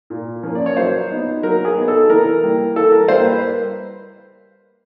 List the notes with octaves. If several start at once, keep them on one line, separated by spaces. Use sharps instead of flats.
A#2
F3 A#3 C#4
D5
C#5
F#3 C5
B3 D#4
F#3 A#4
G#4
B3 D#4
A4
E3 A#4
G3 A#3
E3 A4
A#4
G3 A#3 C5
B4